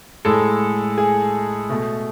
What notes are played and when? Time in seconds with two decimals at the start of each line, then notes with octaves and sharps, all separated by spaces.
0.25 A2 G#3 A4
0.98 G#4
1.69 B2 A3